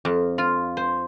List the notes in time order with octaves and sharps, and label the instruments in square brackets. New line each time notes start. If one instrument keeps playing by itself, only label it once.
[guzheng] F2
F4
C5